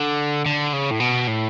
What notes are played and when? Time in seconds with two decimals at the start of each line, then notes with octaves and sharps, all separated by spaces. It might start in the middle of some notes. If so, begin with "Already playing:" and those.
Already playing: D3
0.46 D3
0.73 C#3
0.91 A2
1.00 B2
1.28 A2